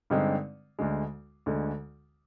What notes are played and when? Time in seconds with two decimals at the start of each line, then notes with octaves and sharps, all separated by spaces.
0.10 G2 D3 G#3 C4 D#4
0.79 D2 D3 G#3
1.46 D2 D3 G#3